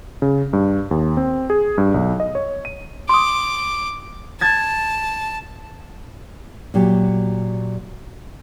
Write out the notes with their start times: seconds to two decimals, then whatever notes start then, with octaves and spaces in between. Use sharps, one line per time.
0.22 C#3
0.53 G2
0.91 D#2
1.17 C4
1.50 G#4
1.78 G2
1.94 B1
2.20 D#5
2.35 C#5
2.65 D#7
3.09 C6 D6 D#6
4.41 A5 G#6 A6
6.74 A#2 F#3 G4